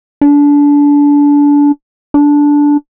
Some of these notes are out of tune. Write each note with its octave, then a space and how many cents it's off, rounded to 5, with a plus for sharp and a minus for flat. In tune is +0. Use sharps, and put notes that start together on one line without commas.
D4 -25
D4 -10